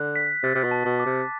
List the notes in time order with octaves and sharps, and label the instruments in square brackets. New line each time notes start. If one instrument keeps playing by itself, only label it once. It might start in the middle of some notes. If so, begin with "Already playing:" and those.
Already playing: [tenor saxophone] D3 [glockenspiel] F#6
[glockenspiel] B6
[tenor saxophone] C3 [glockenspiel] A6
[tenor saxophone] C3
B2
[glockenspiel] A5
[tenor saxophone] B2
[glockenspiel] D6
[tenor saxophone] C3